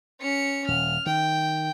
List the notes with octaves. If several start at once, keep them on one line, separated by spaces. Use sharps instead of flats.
C#4 C#7
D#1 F6
D#3 G5